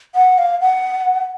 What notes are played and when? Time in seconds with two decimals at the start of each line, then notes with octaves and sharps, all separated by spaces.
0.15 F#5
0.38 F5
0.61 F#5